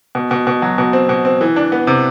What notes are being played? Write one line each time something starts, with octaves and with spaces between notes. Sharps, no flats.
B2
B2
B2
F#3
B2
C4
B2
C4
E3
D4
B3
C3